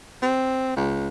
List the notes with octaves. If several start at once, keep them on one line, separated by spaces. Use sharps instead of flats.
C4
C#2